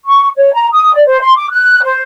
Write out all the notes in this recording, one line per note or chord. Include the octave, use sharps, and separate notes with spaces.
C#6
C#5
A#5
D#6
D5
C5
C6
D6
F#6
C5